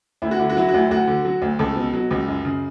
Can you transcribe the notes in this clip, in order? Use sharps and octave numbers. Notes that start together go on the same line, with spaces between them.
D2 E4
F#4
D3 E4
F#4
F#3 E4
F#4
D2 E4
D2 F#4
D3
F#3
D2
C#2 A4
B2
F#3
C#2
F#2
C#3